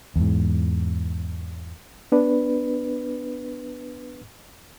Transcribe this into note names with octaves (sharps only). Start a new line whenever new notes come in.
E2 G#2
B3 D4 B4